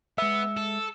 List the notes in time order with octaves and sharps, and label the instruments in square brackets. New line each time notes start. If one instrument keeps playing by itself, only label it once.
[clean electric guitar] G#3 E5 [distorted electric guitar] B3 [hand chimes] E6
[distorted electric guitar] A4